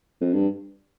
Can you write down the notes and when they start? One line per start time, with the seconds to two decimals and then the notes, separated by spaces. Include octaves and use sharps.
0.21 F2
0.34 G2